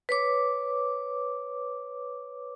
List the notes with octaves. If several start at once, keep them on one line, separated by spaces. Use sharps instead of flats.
B4 C#5 D6